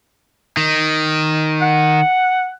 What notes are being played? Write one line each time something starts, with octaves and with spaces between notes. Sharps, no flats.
D#3
F#5